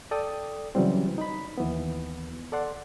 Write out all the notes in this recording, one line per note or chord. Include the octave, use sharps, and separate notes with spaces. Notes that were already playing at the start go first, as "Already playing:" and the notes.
A4 D5 G5 D#6
C#3 E3 F#3 G3 C4
D#4 B5
D#2 E3 B3
A4 D5 F#5 C6